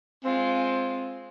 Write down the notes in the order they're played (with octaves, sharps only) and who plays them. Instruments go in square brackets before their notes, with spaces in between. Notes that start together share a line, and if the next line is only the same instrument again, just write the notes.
[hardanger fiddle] G#3 F4 [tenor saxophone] C4